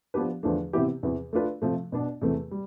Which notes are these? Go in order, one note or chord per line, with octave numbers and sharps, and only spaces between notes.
F3 B3 D4 G4 B4
E2 D3 F3 A3 D4
C3 E3 B3 E4 G4
E2 C3 E3
A3 D4 F4 B4
C3 F3 A3
B2 B3 D4
E2 C3 E3 A3
G3